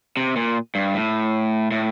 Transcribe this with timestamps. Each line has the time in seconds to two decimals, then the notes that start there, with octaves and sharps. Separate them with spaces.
0.17 C3
0.36 A#2
0.75 G2
0.94 A2
1.71 A2